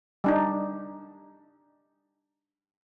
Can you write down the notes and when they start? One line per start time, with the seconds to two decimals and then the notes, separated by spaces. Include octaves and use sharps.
0.24 G3 D4 D#4